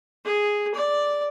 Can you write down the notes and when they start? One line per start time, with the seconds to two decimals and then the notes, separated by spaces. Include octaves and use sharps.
0.25 G#4
0.74 D5